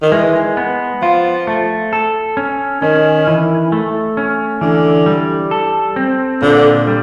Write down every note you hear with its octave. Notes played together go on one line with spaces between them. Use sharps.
D#3
E3 G#3
B3
F3 F4
A3
A4
C#4
D#3 C#4
E3
A3
C#4
D3 E3
G3
A4
C4
A#2 D3
G3